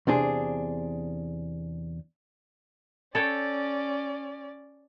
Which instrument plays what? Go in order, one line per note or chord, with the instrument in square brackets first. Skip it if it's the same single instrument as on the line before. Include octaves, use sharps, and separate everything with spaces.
[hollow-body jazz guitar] E2 C3 D4 G#4
[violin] C#4 D5 [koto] A4 C#5 G5